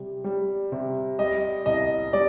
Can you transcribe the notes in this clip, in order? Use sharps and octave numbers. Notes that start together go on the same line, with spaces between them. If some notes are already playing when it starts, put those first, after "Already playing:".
Already playing: C3 G3
G3
C3
G3 D#5
C2 D#5
G3 D5